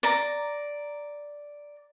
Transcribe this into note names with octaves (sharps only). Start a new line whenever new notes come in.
D5 A#5